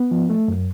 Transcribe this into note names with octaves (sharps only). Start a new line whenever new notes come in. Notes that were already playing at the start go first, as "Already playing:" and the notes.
Already playing: B3
F3
A3
F#2